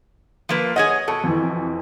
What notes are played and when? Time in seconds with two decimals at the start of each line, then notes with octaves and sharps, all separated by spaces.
0.49 F3 A#3 B4
0.76 G#4 C#5 D#5 F#5
1.08 B2 A4
1.24 F2 E3